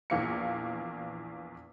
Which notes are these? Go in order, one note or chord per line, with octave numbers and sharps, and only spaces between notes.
A#1 E2 A#3 C#7